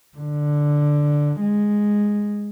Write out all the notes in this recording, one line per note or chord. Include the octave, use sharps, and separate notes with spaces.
D3
G#3